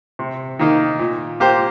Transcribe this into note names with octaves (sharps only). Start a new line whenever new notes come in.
C3
D#3 A#3 D#4
A#2
A#3 G4 C5